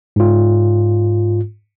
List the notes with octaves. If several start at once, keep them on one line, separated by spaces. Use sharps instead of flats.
G#2 F4